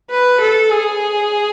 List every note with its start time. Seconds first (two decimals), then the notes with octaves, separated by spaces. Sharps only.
0.11 B4
0.40 A4
0.71 G#4